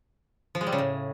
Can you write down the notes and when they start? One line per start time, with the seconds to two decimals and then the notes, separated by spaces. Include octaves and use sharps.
0.55 F3
0.61 G#3
0.67 G3
0.72 C#3
0.78 A2